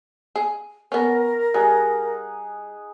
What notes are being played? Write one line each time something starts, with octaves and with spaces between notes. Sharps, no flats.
G#4
B3 C#4 A#4
G3 D#4 G#4 F#5